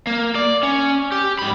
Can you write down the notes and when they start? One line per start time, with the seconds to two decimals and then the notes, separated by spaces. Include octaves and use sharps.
0.07 A#3
0.35 D5
0.63 C#4
1.12 G4
1.39 G#2 B5